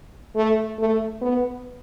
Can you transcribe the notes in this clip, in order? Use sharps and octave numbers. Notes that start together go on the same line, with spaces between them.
A3
A3
B3